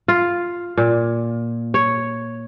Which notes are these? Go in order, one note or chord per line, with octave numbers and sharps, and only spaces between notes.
F4
A#2
C#5